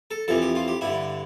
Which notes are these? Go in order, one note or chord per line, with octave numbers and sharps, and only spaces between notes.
A4
F2 C3 E3 A4
G4
F4
G4
G2 D3 E4